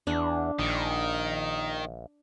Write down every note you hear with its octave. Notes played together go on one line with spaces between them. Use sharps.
E2 D4
A#1 D#3